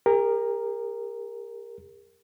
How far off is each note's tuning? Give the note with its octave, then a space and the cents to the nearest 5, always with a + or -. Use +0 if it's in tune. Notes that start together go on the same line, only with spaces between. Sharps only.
G4 +45 A#4 +0